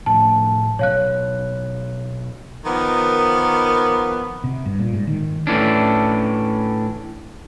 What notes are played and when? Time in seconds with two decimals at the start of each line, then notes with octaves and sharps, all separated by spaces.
0.06 A2 F3 A3 A5
0.79 B2 F#3 C#5 F5 F#6
2.65 D#3 F3 A#3 B3
4.44 C3
4.66 G2
4.80 A#2
4.93 G#2
5.07 D#3
5.47 A2 E3 C#4 D4